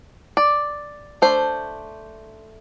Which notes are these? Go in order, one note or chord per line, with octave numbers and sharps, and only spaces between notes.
D5
A3 D4 C5